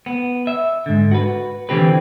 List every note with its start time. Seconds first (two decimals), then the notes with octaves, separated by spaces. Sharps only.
0.06 B3
0.47 E5
0.86 G#2 D3
1.11 F#4 B4
1.69 D3 E3 F3 C4 G4 B4